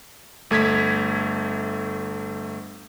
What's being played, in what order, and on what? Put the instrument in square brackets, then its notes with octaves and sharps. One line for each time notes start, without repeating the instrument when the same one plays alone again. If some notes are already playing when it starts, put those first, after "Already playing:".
[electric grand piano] G1 A3 G#6 B6